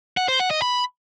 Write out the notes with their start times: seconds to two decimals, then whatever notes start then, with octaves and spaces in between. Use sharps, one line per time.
0.17 F#5
0.28 C5
0.40 F#5
0.51 D#5
0.62 B5